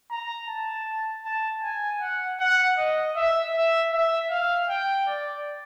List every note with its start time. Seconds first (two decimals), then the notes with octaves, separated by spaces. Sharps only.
0.10 A#5
0.48 A5
1.25 A5
1.63 G#5
2.00 F#5
2.40 F#5
2.78 D#5
3.16 E5
3.54 E5
3.92 E5
4.30 F5
4.69 G5
5.07 D5